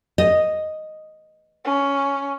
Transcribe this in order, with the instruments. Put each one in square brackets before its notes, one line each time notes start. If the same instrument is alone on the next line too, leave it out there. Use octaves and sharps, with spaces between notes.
[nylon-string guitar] D#5
[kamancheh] C#4